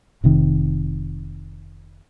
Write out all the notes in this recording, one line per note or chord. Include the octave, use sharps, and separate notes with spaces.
F1 C3 D#3